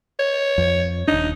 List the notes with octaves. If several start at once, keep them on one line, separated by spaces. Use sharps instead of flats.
C#5
F2
D#1 D4 D#4